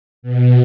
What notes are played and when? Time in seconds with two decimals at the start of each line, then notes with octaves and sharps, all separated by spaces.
0.22 B2